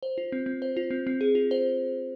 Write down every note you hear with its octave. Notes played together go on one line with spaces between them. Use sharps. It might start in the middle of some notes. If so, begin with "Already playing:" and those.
C5
F4
C4
C4
C5
F4
C4
C4
G#4
F4
C5